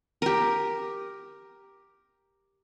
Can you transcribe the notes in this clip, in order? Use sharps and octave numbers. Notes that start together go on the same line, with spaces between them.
G4 A#4